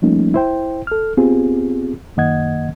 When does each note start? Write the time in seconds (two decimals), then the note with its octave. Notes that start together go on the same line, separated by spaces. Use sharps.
0.02 F3 G3 A3 A#3 C#4 D#4
0.34 E4 C5 G5
0.87 A4 F6
1.17 B3 C4 F4 G4 G#4
2.17 F#2 D#3 A#3 D#5 F#5 G#6